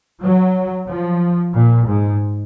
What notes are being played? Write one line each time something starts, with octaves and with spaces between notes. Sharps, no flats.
F#3
F3
A#2
G#2